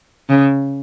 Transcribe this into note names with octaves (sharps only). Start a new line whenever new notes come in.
C#3